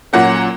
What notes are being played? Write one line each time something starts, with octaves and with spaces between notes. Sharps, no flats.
A#2 F#3 A#3 C#4 F#5